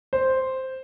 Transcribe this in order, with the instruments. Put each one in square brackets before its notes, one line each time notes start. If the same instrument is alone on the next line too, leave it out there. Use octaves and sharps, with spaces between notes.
[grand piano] C5